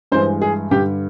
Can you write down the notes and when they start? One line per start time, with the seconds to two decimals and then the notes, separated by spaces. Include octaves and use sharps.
0.12 G2 E3 G#3 C5
0.42 G#4
0.71 G2 D3 G3 G4